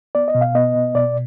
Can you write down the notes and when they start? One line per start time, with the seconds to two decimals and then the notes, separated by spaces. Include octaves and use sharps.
0.15 B3 D5
0.28 D#5
0.35 B2
0.41 F5
0.55 B3 D#5
0.75 B2
0.95 B2 D5